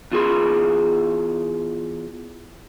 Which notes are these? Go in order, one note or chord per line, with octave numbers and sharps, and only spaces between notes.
E2 F4 G#4 C6